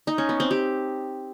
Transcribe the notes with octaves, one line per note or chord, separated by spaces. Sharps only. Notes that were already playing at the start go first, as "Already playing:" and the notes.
D#4
C#4
B3
C4
G4